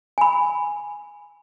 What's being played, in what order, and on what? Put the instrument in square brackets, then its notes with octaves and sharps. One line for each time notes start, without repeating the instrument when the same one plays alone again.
[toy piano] G#5 B5